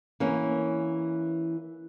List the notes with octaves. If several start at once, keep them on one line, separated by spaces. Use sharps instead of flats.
E3 A#3 C#4